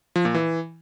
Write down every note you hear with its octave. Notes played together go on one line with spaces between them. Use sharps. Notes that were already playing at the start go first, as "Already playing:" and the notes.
F3
A#2
E3